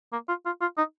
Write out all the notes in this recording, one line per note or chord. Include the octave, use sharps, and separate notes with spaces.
A#3
F4
F4
F4
D#4